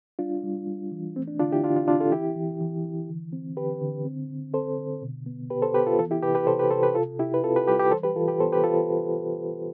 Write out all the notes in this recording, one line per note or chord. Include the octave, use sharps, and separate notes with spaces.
G3 D4 F4
G3
G3
E3
A3 C4
D4
D3 D4 F4
E4 G4
D3 D4 F4
D4 F4
C4 D4 F4
F4 A4
E3 E4 G4
E3
E3
E3
D3
C4
D3 G4 B4
D3
C4
D3
C4 A4 C5
D3
B2
B3
B3 G4 B4
A4 C5
B3 G4 B4
F4 A4
E3 F4 A4
E4 G4
C3 G4 B4
G4 B4
C3 A4 C5
G4 B4
C3 A4 C5
G4 B4
C3 F4 A4
C3 E4 G4
B4
C4 F4 A4
G4 B4
G3 G4 B4
G4 B4
E3 A4 C5
G4 B4
E3 F4 A4
G4 B4
B3 A4 C5
G4 B4
E3 F4 A4